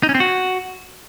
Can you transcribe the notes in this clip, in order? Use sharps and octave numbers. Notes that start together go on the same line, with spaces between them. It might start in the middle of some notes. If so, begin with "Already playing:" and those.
D#4
C#4
C4
F#4